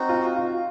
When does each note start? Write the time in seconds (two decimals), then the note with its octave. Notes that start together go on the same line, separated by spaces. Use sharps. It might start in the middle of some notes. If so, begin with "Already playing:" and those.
Already playing: C4 D#4 F#4
0.09 F4
0.36 F4